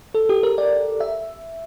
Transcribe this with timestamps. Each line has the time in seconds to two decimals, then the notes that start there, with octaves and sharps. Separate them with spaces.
0.15 A4
0.29 G4
0.43 A#4
0.58 D5
1.00 E5